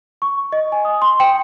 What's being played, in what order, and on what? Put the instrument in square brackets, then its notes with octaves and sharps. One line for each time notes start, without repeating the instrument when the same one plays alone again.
[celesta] C#6
D#5
G#5
D#6
C6
G5